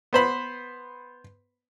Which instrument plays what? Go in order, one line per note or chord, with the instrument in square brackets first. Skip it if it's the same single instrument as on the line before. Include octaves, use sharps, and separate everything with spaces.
[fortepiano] B3 C5 B5